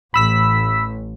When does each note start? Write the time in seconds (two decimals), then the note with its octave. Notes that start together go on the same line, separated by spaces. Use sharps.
0.14 A1 B5 E6 B6